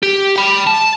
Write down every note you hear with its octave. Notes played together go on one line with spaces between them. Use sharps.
G4
G5 B5
A5